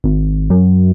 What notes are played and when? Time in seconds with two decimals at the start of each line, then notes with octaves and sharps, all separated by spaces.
0.04 G#1
0.50 F#2